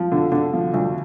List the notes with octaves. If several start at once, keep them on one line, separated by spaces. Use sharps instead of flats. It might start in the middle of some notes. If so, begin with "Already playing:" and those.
Already playing: F3
D3
D3
F3
D2